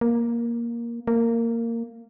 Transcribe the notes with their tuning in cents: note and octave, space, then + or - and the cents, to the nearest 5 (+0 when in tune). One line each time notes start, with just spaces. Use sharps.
A#3 +10
A#3 -15